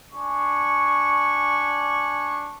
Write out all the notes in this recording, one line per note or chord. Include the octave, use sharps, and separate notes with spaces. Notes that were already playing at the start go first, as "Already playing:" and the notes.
D4 G#5 C#6